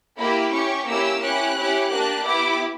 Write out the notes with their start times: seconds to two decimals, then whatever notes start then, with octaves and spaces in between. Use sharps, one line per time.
0.17 A#3 E4 G4 B5
0.51 C#4 G4 C#6
0.86 A#3 C#4 E4 G4 E6
1.21 C#4 E4 G4 F#6
1.55 C#4 E4 G4
1.89 A#3 D4 G4 F#6
2.24 B3 E4 G4 D6